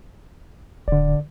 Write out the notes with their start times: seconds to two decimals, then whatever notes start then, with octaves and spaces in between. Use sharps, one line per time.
0.88 D1 D3 D5